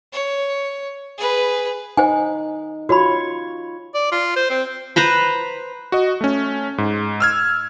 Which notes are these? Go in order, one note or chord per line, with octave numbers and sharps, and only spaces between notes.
C#5
G#4 B4
D#4 C5 F#5 G#5
F4 F#4 C#5 B5
D5
F4
C5
C4
B4 C5 A#5 B5
F#4 D#5
A3 C#4
G#2
E6 F6 G#6